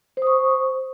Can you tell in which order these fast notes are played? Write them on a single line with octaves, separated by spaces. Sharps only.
C5 D#6 C#6